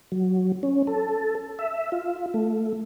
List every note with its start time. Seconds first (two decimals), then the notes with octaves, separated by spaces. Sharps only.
0.12 F#3
0.63 C#4
0.87 A4
1.59 E5
1.92 F4
2.34 A3